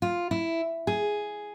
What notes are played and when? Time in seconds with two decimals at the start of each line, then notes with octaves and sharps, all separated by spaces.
0.02 F4
0.31 E4
0.87 G#4